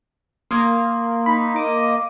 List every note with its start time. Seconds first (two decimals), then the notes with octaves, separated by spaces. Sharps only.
0.51 A#3 C6 D#6 G#6
1.26 D#4 B5
1.56 D#5 D6